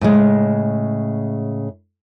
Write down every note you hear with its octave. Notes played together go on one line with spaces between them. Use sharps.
A2 C#3 G#3